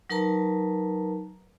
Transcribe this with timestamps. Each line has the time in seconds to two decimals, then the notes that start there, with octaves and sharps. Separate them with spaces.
0.10 F#3 D#4 A#4 B4 A5 A#5